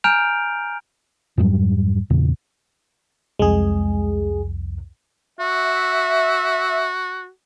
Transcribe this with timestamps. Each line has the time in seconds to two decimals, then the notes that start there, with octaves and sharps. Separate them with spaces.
0.04 G#5 A#5 F6 G6 D7 F7
1.38 F2 G#2 F#3 G3
2.10 E2 A#2 C#3
3.39 C2 F2 G#3 G#4
5.40 F#4 E5